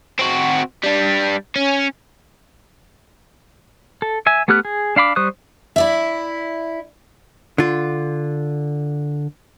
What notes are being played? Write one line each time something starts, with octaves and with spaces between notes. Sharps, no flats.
C4 F#4
G3 D4
C#4
A4
E5 G#5
A3 B3 G4 F6 F#6
G#4
D4 F5 B5 D6
G3 C5 C#6 D#6 F#6
E4 D5 E5
D3 F4